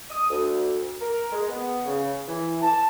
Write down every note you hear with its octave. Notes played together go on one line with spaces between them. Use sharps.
D#6
D2
A#4
G#3
B3
C#3
E3
A5